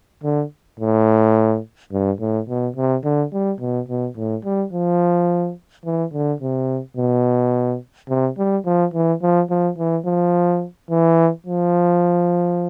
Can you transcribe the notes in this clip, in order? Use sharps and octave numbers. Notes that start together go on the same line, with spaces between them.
D3
A2
G2
A2
B2
C3
D3
G3
B2
B2
A2
G3
F3
E3
D3
C3
B2
C3
G3
F3
E3
F3
F3
E3
F3
E3
F3